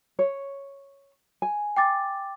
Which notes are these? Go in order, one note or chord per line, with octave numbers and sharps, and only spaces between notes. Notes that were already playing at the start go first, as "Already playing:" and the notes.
C#5
G#5
G5 D6 A6